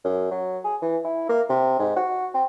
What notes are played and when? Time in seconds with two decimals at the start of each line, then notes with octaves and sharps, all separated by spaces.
0.05 F#2
0.31 F#3
0.64 G#4
0.82 E3
1.05 E4
1.29 A#3
1.49 C3
1.79 G#2
1.96 F#4
2.34 C4